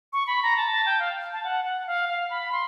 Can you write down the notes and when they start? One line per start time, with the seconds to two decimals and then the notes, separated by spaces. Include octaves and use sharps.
0.13 C#6
0.27 B5
0.43 A#5
0.57 A5
0.72 A5
0.86 G5
1.00 F5
1.33 A5
1.44 F#5
1.65 F#5
1.87 F5
2.09 F5
2.30 B5
2.52 C6